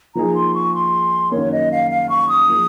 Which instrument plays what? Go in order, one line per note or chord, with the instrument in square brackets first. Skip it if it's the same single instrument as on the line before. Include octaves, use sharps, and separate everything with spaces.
[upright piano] F3 A#3 D#4 G#4 [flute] A#5
[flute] C6
C#6
C6
[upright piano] F#2 D#3 A#3 [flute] C#5
[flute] D#5
F5
F5
C#6
D#6
[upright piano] F3 A#3 F4 G#4